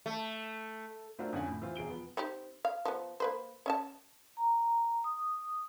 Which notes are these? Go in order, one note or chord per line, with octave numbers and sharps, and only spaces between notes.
A3
A3 C4 D4 F4 F#4 A#4
F2 D3 C#4 F#5 G#5
A2
E3 C4 F4
E1 G#4 D7 G7
F3 B3
C4 D#4 G4
F5
F3 B3
A#3 B4 C5
C#4 E5 A5
A#5
D#6